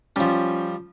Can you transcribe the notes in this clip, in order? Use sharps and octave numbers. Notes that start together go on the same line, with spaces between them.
F3 G3 C#4 F4